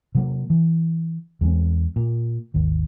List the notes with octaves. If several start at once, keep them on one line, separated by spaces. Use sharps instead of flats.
C3 F#3 A#3
E3
E2 G#3 C4
A#2
G#1 D#2